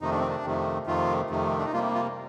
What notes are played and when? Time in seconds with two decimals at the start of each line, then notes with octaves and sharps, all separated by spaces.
0.01 F2 C3 D#3 A3 D#4
0.11 D4
0.19 C4
0.28 D4
0.44 F2 C3 D#3 A3
0.87 F2 C3 D#3 A3 F4
1.30 F2 C3 D#3 A3
1.59 D4
1.65 D#4
1.73 C3 G3 A#3 F4
1.95 F4